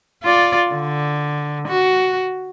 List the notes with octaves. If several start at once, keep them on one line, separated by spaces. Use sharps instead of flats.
F4 D5
D3
F#4